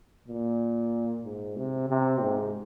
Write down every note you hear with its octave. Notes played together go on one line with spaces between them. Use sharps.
A#2
G#2
C3
C3
G#2